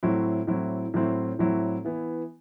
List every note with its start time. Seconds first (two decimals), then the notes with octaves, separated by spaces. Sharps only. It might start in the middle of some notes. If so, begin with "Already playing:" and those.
0.03 A2 F#3 C4 E4
0.47 A2 F#3 C4 E4
0.94 A2 F#3 C4 E4
1.39 A2 F#3 C4 E4
1.85 E3 B3 E4